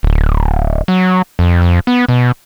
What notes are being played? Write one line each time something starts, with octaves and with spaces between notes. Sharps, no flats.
D1
F#3
F2
F2
B3
B2